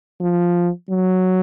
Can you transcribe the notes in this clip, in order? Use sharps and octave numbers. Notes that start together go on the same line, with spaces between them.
F3
F#3